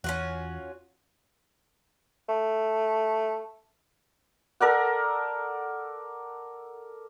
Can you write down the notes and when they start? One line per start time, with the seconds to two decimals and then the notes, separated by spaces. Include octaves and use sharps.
0.04 E2 C#4 F4 F#4
2.29 A3
4.60 A4 A#4 D5 F#5